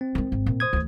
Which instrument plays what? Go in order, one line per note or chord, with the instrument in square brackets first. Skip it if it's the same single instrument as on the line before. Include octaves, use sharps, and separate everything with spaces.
[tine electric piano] C4
[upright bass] D#3 G#3
G#1
A#2
[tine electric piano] C5 D#6 G#6
[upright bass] D2 E3